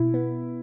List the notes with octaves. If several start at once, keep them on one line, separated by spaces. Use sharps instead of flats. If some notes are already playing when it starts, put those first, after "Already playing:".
Already playing: B2 E4
B3